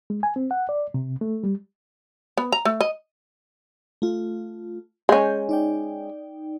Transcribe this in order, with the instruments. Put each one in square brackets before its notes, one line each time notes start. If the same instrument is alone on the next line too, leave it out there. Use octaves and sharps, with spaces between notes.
[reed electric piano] G#3
G#5
C4
F#5
D5
C3
A3
G3
[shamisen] B3
A#5
A3
D#5
[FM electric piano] A3 F4
[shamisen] G#3 C#4 [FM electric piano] G6
[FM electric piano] D#4 D5 G5